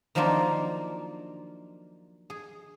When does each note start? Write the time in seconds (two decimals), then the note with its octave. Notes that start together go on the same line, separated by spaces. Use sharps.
0.15 D#3 F3 F#3 A#3 D4 F4
2.30 G#4